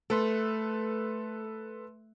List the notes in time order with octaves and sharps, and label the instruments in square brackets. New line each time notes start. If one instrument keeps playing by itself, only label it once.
[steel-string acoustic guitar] A3 [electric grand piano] A4 B4 C6